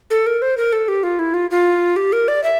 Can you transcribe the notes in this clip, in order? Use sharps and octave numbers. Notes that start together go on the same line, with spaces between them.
A4
A#4
C5
A#4
A4
G4
F4
E4
F4
F4
G4
A#4
D5
E5